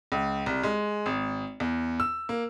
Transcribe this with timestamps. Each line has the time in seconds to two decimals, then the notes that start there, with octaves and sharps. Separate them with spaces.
0.12 C#2
0.46 C2
0.63 G#3
1.06 G#1
1.60 E2
2.00 E6
2.29 A#3